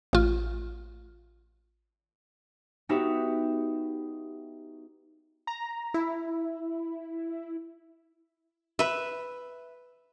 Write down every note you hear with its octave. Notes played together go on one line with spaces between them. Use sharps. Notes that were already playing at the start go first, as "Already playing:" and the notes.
A1 F4
B3 D#4 F#4 G4 E5
A#5
E4
B4 E5